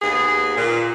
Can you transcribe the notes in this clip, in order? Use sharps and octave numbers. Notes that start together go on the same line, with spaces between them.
D#2 B3 G#4
A#2